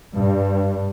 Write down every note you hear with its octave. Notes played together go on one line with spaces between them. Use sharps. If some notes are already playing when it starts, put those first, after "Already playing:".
G2